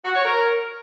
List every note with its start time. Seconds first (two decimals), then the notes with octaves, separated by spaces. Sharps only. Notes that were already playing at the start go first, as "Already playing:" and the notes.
0.05 F#4
0.15 C#5
0.25 A#4